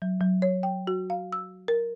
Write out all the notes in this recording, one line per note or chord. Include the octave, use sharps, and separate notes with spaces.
F#3
F#3
C#5
G5
F#4
F5
E6
A#4